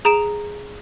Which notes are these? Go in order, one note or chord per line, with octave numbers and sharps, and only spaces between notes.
G#4 A#5 D7 E7